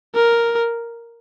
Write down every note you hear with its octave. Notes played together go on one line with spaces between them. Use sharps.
A#4